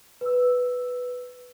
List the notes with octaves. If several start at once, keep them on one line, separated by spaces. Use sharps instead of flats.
B4 E6